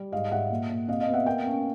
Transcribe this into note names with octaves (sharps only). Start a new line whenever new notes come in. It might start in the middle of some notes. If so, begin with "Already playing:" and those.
Already playing: G3
G#2 D#5 F5
G#2 E5 F#5
A#2
A#2
C3 D#5 F5
D#5 F5
B3
E5 F#5
A#3 F5 G5
C#4